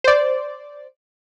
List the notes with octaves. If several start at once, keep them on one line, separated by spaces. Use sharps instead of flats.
C5 D5